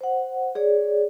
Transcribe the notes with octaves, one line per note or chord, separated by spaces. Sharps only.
C5 F#5
G#4 C#5 D5